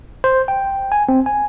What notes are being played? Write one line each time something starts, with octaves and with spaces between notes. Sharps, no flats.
C5
G5
G#5
C4
G#5